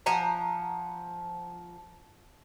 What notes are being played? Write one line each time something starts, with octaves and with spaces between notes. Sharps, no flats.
F3 F#5 G#5 A#5